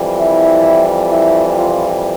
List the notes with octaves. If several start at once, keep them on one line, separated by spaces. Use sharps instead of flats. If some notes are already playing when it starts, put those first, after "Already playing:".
Already playing: F2 E3 G3
E4
E4
F4